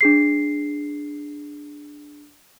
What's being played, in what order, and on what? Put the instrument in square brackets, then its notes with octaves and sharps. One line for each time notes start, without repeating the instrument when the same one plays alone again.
[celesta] D4 G#4 C7